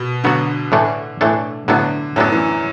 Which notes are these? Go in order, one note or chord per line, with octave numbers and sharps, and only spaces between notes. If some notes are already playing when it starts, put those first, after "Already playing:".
Already playing: B2
D3 F#3 B3 F#4
A2 E3 A3 D4 A4
A2 E3 A3 D4 A4
A2 D3 F#3 B3 D4 A4
F#2 A2 F#3 B3 D4 A4
E3